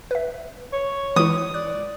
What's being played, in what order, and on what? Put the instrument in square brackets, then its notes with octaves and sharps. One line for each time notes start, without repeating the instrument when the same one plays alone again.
[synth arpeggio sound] B4 E5
[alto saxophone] C#5
[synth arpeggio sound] E3 G#3 E4 [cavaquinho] D#6
[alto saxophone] D5 [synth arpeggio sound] F#6